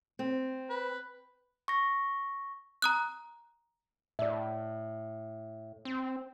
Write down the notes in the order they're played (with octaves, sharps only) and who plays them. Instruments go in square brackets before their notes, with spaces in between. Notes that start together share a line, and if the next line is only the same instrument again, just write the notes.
[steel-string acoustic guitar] C4
[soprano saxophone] B4
[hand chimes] C#6 A#6
[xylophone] A#5 D#6 F#6
[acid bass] A2 [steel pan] D5 E5
[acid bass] C4